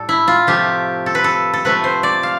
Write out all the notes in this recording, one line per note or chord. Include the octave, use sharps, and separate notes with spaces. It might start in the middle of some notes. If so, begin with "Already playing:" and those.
Already playing: A2 G3 A4
E4
F4
C3 F3 A3 G4
A4
B4
A4
A4
C3 F3 A3 B4
C5
D5
F5